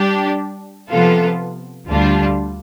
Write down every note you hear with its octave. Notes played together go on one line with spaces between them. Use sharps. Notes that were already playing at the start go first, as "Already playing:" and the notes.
Already playing: G3 D4 G4
C3 F3 B3 F4 A4
D2 D3 G3 D4 F4